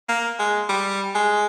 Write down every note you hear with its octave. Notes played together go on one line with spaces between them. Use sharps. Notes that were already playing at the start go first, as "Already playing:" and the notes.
A#3
G#3
G3
G#3